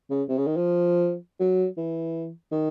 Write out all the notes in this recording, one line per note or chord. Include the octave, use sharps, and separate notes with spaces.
C#3
C3
C#3
D#3
F3
F#3
E3
D#3